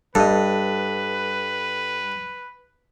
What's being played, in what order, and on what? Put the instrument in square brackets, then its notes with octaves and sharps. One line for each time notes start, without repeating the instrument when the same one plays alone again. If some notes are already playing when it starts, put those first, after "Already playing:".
[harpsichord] G2 [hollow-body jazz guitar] G3 D#5 [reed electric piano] A4 [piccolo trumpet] B4